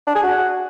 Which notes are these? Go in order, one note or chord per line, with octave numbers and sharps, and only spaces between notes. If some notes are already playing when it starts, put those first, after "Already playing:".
D4
G#4
F#4